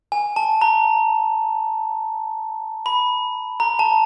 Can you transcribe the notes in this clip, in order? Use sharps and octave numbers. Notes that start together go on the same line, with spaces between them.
G#5
A5
A#5
B5
A#5
A5